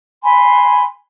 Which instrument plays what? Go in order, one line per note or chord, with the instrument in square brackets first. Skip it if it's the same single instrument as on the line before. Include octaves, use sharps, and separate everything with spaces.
[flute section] G#5 B5 C6